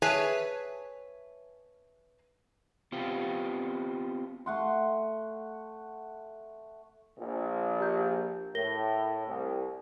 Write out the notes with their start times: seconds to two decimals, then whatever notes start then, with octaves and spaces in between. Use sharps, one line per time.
0.02 G#4 B4 C#5 E5 G#5 A5
2.92 B3 C4 F4 G4
4.46 A3 F#5 C6
7.19 A#1
7.79 G4 A#5 G6
8.55 A2 A#4 A#6 G7
9.28 C2